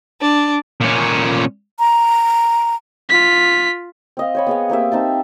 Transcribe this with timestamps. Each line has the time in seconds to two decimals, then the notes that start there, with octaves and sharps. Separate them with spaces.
0.20 D4
0.81 A#2 C#4
1.79 A#5
3.09 F4 B6
4.17 C4 D#5 F5
4.35 C5 C#5 B5
4.47 B3 G#4 F5
4.70 A#3 C4 G4 E5
4.92 C4 D#4 E5 A5